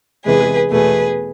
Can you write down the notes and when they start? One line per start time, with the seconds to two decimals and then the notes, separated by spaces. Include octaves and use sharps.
0.25 E2 C3 E3 G#3 G#4 B4
0.71 E2 B2 A3 G#4 B4